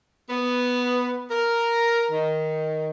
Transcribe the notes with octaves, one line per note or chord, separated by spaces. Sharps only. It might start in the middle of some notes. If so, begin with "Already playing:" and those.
B3
A#4
D#3